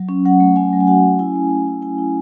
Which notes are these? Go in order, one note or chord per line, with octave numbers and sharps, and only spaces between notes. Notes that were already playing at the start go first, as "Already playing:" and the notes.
Already playing: F#3
C#4
F#3 F#5
A3
C#4 G#5
F#3
G#5
F#4 F#5
C#4
E4 G#5
A3
E4
E4
E4 G#5
E4